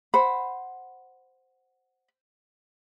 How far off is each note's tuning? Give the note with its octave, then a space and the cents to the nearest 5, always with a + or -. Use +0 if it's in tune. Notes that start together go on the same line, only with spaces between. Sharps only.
C5 +0 F#5 +0 B5 +0